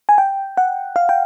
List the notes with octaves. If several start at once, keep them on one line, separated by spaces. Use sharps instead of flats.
G#5
G5
F#5
F5
G5